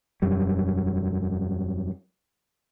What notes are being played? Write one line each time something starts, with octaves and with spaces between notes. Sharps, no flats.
E1 F#2 G3